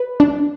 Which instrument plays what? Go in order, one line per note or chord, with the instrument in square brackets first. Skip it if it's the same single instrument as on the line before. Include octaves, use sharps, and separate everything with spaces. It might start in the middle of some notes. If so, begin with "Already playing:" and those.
Already playing: [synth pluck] B4
D4